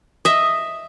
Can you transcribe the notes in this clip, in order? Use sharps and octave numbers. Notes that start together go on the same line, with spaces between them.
D#5 E5